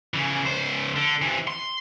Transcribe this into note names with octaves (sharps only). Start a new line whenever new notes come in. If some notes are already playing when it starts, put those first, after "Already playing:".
C#3 E3
C#2 C5
D3
C3 E3
C6